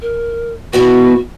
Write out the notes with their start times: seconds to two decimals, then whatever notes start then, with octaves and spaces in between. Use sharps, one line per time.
0.02 A#4
0.73 B2 E3 B3 F#4